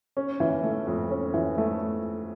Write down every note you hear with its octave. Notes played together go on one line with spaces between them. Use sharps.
C#4
E3
A3
F2
C#4
E3
A3